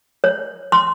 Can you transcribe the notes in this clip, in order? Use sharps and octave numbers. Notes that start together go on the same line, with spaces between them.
C#5
C6